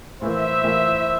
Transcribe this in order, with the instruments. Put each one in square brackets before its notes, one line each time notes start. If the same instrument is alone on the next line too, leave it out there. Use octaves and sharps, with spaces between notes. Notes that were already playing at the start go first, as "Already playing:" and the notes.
[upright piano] A2 E3 A#3 [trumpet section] C5 E5
[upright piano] A2 E3 A#3